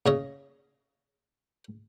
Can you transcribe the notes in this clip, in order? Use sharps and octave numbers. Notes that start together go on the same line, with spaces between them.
C#3 C#5 D#5